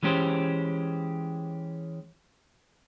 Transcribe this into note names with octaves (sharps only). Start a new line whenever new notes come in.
E3 G#3 C#4 G4 C5